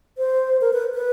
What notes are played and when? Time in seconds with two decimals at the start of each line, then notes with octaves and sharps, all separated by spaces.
0.18 C5
0.61 A#4
0.73 B4
0.95 B4